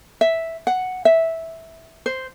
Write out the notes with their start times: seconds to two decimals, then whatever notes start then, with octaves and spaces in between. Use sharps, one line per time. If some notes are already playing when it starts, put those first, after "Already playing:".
0.21 E5
0.67 F#5
1.05 E5
2.06 C5